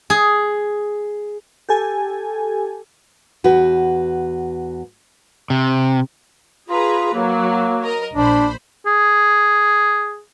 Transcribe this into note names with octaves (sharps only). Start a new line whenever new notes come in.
G#4
G4 A4 G#5
E2 F#4 B4
C3
F4 G#4 B4 A#5
F#3 A#3
A#4 D#5
A#1 D4 C5 B5
G#4